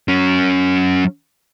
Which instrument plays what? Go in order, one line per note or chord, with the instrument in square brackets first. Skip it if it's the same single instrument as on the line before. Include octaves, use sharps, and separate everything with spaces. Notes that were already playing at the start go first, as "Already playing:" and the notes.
[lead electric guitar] F#3 C#4